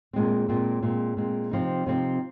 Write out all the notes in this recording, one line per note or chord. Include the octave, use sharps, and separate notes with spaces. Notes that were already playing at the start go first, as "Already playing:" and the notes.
A#2 G#3 C4
A#2 G#3 C4
A#2 G#3 C4
A#2 G#3 C4
C3 F3 C4 D#4
C3 F3 C4 D#4